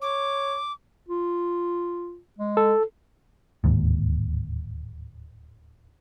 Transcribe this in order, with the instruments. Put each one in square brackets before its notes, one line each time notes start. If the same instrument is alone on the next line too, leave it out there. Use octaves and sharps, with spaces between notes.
[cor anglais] C#5 [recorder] D6
[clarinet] F4
G#3
[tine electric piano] A4
[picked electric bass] D1 D#2 G#2